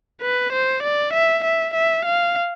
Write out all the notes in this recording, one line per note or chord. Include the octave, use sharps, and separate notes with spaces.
B4
C5
D5
E5
E5
E5
F5